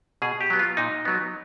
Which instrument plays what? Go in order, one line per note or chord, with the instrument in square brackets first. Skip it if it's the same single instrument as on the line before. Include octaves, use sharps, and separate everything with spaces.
[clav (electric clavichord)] B2 G#4
G4
F#3 B3
F4
A#2 D#4
F#3 B3